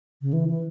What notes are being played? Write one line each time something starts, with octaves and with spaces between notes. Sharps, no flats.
C#3
E3
E3